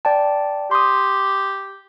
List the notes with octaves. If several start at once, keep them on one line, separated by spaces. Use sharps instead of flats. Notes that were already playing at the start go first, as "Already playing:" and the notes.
D5 G5 A5
G4 C6 D#6